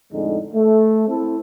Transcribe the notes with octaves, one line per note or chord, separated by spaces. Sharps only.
F2 A2 D3 G#3 D#4
A3
C4 E4 A4